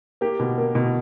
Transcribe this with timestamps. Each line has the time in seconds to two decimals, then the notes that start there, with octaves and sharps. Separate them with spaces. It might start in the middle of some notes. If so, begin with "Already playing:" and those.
0.21 A#3 G4
0.40 B2
0.58 A#3
0.75 B2